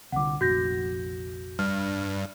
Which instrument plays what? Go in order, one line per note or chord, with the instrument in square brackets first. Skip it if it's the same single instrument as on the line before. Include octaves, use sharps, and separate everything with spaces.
[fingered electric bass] C2 D3 [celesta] F#5 D6
[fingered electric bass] F1 A#1 [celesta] F#4 G6 A#6
[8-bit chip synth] G2 [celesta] F6